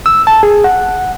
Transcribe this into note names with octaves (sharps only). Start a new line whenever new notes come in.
E6
A5
G#4
F#5